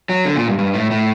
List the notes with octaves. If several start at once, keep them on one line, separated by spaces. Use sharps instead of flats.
F#3
D3
A#2
G2
G2
A2
A2